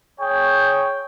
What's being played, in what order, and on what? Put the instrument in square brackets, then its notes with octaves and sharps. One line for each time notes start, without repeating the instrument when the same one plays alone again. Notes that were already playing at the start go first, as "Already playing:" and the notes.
[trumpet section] G#4 C#5 G5